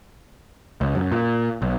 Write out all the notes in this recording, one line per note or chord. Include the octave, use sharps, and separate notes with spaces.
C#2
F#2
A#2
B1